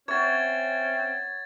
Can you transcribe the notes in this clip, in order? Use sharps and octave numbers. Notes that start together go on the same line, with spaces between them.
C4 C#4 C#5 E5 F#5 G#6 A6